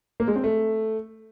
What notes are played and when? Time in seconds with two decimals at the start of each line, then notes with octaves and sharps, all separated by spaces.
0.20 A#3
0.28 G#3
0.36 C4
0.44 A3